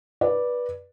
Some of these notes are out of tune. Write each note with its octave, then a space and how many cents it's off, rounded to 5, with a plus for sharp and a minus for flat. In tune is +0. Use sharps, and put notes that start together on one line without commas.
B4 -15 D5 +0